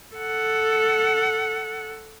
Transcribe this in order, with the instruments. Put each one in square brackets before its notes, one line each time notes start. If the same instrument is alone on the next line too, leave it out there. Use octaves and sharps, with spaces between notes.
[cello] A4 F#5